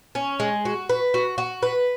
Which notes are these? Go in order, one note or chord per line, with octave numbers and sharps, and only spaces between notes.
C#4
G#3
F#4
B4
F#4
F#4
B4